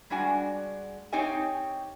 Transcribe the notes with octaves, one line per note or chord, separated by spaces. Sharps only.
G3 G#3 D4 F#4 G#5
C4 D#4 G4 C#5 D#5 G#5